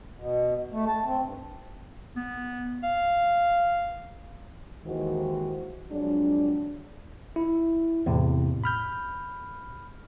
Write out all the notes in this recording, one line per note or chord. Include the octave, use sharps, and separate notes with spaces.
B2
A3
A5
C4
G2
B3
F5
D#2 D#3 E3 G#3 F#4 C5
F2 F#3 G#3 D4
E4
E2 A2 C3
B5 F6 G6